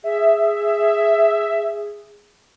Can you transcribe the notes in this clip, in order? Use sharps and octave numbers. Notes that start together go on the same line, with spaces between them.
G#4 E5